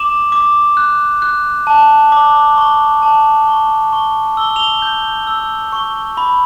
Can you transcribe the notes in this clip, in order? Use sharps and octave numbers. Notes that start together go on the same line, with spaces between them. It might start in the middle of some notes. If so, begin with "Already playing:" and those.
Already playing: D6 E7 F#7
D6
F#6
F#6
A5
D6
C#6
A5
C#6
C#6
E6 G7
F#7
F7 G7
G6
E6
C#6
B5